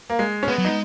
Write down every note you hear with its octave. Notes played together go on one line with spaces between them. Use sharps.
A#3
G#3
C#4
G#3 B3
F#3
G#3 D#4